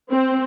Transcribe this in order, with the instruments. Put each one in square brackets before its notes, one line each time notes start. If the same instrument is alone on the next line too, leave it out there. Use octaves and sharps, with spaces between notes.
[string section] C4